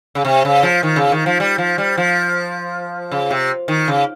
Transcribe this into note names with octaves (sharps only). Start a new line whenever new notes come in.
C#3
C3
C#3
F3
D#3
C#3
D#3
F3
G3
F3
G3
F3
C#3
C3
D#3
C#3